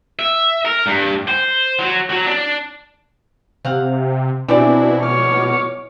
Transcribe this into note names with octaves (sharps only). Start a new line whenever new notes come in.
E5
A#4
G2
C5
F#3
F#3
D4
C3 C4 F5 F#5
B2 E3 G3 C4 D4 E4 D5
C#5 D6 F6